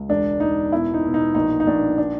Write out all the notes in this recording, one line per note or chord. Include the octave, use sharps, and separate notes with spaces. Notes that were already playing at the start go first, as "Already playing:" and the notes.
Already playing: C#2
E1 D4
E1 D#4
B2 E4
D#4
B2
D#4
A#1 D#4
D#4
A#1 D4
D4